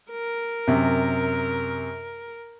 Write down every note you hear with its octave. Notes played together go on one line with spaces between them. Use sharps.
A#4
F#2 C3